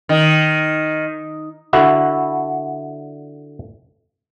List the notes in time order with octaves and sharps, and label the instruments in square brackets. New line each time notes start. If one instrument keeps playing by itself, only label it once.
[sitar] D#3
[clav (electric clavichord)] D3 E4 F#4